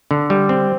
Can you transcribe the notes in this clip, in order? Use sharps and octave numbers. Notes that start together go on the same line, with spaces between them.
D3
G3
C4